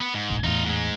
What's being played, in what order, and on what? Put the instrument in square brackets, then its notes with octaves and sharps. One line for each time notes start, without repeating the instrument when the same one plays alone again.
[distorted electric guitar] B3
G#2
[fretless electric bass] F1 A#1
[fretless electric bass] E2 A2 [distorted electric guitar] D#4 F4
[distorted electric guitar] G#2 G#3